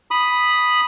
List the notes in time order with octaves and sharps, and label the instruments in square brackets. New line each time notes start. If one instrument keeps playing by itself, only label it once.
[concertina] B5 D#6